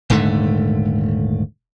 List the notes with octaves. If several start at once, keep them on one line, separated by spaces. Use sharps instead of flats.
D#1 G#2 D3 A3